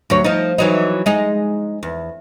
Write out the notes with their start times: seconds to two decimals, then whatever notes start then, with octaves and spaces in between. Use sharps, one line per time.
0.10 D2 F#3 C#5
0.24 F3 D#4
0.58 E3 F#3 D#4
1.06 G#3 D#4
1.83 E2